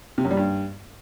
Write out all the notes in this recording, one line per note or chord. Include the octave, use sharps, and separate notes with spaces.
C3
F#2
G3
G2